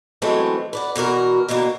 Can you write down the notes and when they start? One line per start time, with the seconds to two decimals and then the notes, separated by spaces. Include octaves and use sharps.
0.22 E3 F#3 G#3 A3 C4
0.73 B4 D5 F#5
0.95 B2 E3 F#4 A#4
1.49 B2 D3 E3 A#3